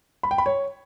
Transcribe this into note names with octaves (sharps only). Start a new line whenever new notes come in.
B5
G5
B5
C#5